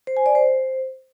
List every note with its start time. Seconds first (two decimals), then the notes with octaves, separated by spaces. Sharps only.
0.07 C5
0.17 G#5
0.26 D5
0.35 C5